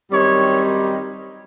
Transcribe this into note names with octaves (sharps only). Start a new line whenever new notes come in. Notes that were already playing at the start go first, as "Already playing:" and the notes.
F#2 D#3 G3 C4 D#4 C#5